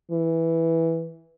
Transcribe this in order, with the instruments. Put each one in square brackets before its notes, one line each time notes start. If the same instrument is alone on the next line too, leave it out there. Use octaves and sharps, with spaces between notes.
[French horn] E3